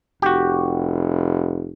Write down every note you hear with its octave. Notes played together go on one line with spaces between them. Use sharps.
F1 F#4 G4